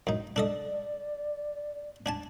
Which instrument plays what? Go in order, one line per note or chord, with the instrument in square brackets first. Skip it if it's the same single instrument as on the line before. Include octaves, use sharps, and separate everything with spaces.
[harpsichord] F#2 D#4
[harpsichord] D4 A4 D#5 [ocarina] D5
[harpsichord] D4 G#5 A5